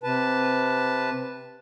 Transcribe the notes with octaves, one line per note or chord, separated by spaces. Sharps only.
C3 B4 A5